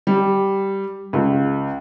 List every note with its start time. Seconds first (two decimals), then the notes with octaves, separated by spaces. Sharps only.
0.07 G3
1.13 C#2